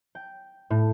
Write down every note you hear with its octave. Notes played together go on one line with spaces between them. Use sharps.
G5
A2